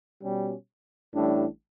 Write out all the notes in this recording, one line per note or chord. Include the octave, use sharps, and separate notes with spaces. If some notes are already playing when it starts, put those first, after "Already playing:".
B2 G3 C#4 G4
A1 A2 G3 D4